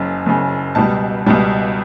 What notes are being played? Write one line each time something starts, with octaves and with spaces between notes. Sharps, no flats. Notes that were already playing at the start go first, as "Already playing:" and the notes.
Already playing: F#1 F#2 C#3
F#1 F#2 C#3
C#2 B2 G3 A5
C#2 B2 G3